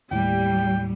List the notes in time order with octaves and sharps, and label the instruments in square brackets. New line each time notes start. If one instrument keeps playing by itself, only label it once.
[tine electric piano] D#2 A2 [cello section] G3 [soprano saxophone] G5